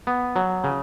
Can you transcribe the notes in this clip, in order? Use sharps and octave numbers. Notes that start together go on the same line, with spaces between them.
B3
F#3
C#3